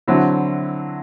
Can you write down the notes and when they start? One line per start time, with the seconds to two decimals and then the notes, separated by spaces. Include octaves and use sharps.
0.08 D3 F#3 C4 E4